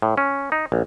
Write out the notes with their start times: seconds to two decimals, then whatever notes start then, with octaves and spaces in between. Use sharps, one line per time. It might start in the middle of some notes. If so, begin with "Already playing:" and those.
0.02 A2
0.18 C#4
0.52 D#4
0.72 A#1